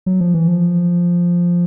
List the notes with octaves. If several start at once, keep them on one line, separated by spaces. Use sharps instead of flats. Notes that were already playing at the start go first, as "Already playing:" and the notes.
F#3
F3
E3
F3